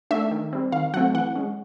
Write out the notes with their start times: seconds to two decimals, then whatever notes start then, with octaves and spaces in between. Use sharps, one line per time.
0.11 A3 D4 E5
0.31 D#3
0.53 G3 C4
0.72 D#3 F5
0.94 F#3 A3 C4 F#5
1.14 E3 F#5
1.35 G#3 C#4